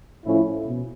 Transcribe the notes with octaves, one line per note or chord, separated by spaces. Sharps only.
A2 F3 A3 C#4 E4
B2